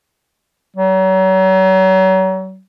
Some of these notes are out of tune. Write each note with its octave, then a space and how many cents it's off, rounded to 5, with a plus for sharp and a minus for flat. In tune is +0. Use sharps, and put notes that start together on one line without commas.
F#3 +35